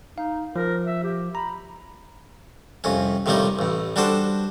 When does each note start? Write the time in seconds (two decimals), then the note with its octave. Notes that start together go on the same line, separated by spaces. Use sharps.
0.18 D#4 F5
0.56 F3 A#4
0.86 E5
1.03 G4
1.35 A#5 B5
2.84 C2 F2 C#4
3.26 A2 C3 D#3 F3 G3 D#4
3.59 A1 A2
3.96 G3 D4 F#4 A4 C5